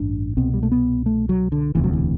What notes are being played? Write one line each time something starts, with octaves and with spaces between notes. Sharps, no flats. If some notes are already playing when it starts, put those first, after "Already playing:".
Already playing: A1 G2 D4
C2 B2 C4
G3
A3
B3
A3
F#3
D3
E1 D2 C3 E3
F#3
E3